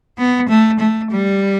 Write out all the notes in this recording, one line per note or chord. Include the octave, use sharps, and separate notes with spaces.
B3
A3
A3
G3